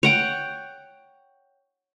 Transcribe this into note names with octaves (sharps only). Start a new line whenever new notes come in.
C#5 F#5 G5